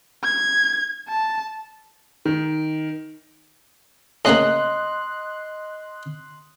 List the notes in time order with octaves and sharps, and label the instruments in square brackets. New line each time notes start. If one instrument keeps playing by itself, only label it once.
[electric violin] G#6
A5
[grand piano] D#3
[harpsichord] A2 C#3 A#3 [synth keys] D#5 C6 F#6